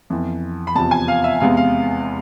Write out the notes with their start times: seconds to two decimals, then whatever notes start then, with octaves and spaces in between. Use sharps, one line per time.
0.10 F2 E3 B3
0.67 B5
0.75 E2 C3 F3 A5
0.91 G#5
1.08 F5
1.24 E5
1.40 E2 C3 G#3 B3 F5
1.57 F5